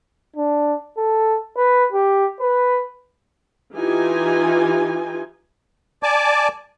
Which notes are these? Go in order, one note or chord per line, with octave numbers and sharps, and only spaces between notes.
D4
A4
B4
G4
B4
E3 D#4 F4 G4 G#5
D5 G#5 A5 D6